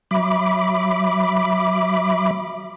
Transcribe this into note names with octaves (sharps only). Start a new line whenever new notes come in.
F#3 E5 B5 D6